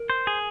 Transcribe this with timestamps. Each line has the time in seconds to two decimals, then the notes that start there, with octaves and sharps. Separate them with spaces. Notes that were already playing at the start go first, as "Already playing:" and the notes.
Already playing: A#4
0.10 C5
0.27 G#4